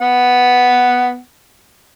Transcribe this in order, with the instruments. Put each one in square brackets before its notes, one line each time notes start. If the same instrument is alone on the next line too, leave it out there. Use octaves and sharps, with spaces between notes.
[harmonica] B3 F#5